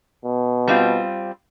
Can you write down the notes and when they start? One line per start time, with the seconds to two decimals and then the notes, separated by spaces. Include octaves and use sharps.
0.25 B2
0.68 G3 C4 F4